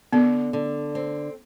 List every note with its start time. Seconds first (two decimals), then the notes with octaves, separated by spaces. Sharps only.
0.13 D3 B3
0.53 D3
0.95 C4